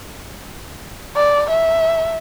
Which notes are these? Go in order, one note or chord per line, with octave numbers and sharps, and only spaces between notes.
D5
E5